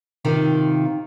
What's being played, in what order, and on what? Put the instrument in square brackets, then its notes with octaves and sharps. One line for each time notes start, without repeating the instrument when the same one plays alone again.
[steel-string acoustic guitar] C3 D#3 F4